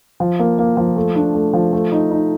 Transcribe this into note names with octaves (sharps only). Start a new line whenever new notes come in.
F3
A#3
A#3
F3
A3
D4
A3
F3
A3
D#4
D#4